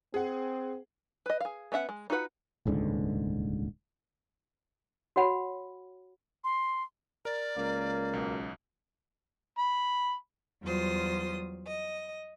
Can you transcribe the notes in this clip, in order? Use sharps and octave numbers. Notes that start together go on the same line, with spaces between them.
C4 G#4 F#5
B4 D#5
G#4 F5
B3 C#4 E5 F#5
G#3
D#4 F4 F#4 B4 F#5
D#1 C#2 G#2 D3
F#4 C#5 F#5 B5
C6
A#4 D5
C#2 A#3
B1 B2
B5
E2 F#3 G3 F4 C5 D#6
D#5